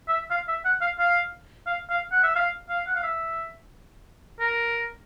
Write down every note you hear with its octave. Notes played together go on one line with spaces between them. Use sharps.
E5
F5
E5
F#5
F5
F5
F5
F5
F#5
E5
F5
F5
F#5
F5
E5
A#4